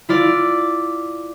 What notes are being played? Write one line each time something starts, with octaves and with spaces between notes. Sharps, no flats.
E4 F4 D5